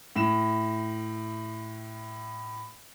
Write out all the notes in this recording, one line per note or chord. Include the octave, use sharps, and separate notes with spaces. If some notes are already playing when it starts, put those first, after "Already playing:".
A2 E7